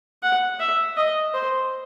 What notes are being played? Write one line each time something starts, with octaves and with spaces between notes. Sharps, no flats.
F#5
E5
D#5
C5